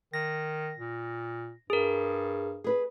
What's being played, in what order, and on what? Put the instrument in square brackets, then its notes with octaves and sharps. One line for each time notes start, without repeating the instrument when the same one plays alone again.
[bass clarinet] D#3 [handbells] A#6
[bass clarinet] A#2
[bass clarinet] G2 [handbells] G#4 A#4
[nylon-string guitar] G#4 B4